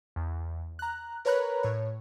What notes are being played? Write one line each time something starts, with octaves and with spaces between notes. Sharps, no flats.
E2
A#5 F#6
A#4 B4 C#5 A#5 B5 F#6
A2 C#5